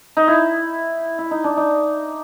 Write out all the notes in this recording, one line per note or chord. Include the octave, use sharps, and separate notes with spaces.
D#4
E4
E4
D#4
D4
D#4